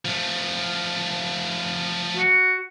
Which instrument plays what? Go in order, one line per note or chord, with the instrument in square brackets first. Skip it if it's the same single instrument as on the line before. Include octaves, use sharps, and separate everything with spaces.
[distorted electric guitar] F3 A3
[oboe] F#4